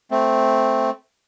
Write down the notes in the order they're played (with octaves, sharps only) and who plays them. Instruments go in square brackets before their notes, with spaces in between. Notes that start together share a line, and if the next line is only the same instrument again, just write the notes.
[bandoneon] A3 C4